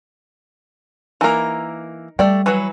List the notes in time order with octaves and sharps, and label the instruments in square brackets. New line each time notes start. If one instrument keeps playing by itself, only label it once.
[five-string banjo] E3 A#3 [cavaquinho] D#4 A#4
[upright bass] G3 [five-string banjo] A3 D5 G5
[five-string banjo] E3 F#3 [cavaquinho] B4 C#5 F#5